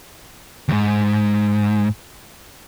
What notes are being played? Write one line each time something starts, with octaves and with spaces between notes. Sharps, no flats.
D#2 G#2